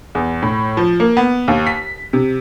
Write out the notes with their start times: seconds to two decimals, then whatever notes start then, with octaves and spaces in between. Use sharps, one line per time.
0.15 E2
0.42 A2
0.77 F3
1.00 A#3
1.17 B3
1.48 D#2
1.67 B6
2.13 C3